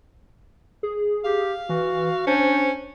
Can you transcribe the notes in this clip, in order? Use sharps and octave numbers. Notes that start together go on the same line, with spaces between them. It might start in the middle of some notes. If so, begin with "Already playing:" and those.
G#4
G4 F5
E3 F#4
C#4 D4 C5